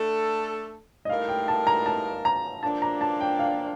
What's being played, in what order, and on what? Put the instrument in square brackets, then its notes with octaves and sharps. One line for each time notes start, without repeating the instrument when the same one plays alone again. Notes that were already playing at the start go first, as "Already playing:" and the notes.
Already playing: [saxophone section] A3 D4 A4
[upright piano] D#5
[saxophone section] A2 G3 A#3 D#4 A#4 [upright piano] F5
[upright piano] G5
A5
A#5
A5
A#5
[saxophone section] A#2 F3 A#3 D4 [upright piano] A5
[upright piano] A#5
A5
G5
F5